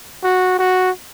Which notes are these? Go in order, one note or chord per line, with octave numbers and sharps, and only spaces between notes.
F#4
F#4